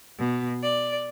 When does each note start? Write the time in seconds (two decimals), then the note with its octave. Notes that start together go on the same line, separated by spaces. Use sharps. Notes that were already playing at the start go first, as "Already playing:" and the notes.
0.19 B2
0.63 D5